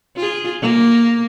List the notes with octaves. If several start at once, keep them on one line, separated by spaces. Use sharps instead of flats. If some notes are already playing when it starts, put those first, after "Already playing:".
F4 G#4
A#3